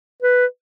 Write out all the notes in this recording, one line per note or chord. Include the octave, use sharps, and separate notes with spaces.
B4